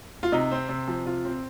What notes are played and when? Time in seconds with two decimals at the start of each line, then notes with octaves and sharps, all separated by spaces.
0.23 F4
0.32 C3 D#4
0.51 C4
0.69 C3
0.88 F3
1.06 C3 F4
1.25 C4